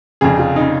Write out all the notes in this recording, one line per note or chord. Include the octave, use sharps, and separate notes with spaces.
F1 F2 C#3 G#4
F4
C#3 D#4